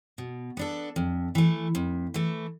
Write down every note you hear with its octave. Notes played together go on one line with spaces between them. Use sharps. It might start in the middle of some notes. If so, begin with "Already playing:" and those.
B2
B3 D4 A4
F2
E3 A3
F2
E3 A3